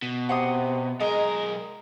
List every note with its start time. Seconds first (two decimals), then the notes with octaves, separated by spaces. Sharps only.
0.02 B2
0.29 C3 F#5 C6 D#6
1.00 B1 G#3 A#4 D#5